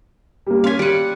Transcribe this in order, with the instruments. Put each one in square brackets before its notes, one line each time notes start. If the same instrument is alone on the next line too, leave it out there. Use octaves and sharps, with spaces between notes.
[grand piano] G3 A#3
[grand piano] C#4 C6 B6 [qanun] F5 G#5
[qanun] G3 F#5 [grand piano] D7 D#7